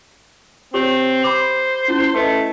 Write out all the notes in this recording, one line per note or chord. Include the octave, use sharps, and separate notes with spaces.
C4 G4 C#5
C5 B5 C6 D6
C#4 E4
A3 B4 D#5